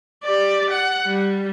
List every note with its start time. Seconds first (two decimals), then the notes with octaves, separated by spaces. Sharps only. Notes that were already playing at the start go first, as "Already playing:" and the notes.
0.24 G4 D5
0.70 F#5
1.06 G3